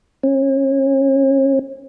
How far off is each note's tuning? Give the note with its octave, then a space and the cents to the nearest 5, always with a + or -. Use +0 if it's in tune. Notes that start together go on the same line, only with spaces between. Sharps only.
C#4 -35